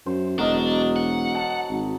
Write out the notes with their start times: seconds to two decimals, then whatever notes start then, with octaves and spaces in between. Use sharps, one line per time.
0.06 F#2 C5
0.38 E1 F#3 D4 A#4 D5 D#5
0.96 F#5
1.35 A5
1.70 G#1